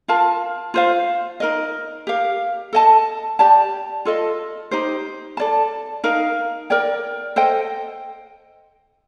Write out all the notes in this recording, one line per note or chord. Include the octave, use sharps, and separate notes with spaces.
F4 A#4 F5 A5
F4 C5 F5
D#4 A#4 D#5
G4 A#4 F5
A4 D#5 A5
G4 D5 A5
F4 A4 D#5
D#4 G4 C5
A4 D5 A5
D#4 A#4 F5
A#4 D5 G5
A4 C5 D#5 G5